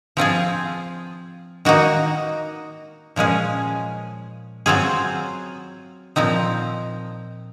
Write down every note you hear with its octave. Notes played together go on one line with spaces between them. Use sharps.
F3 C4 F4 G#4
D#3 A#3 D#4 F#4
A#2 F3 G#3 C#4 G#4
F#3 C4 F4 G#4
A#2 F3 C4 D#4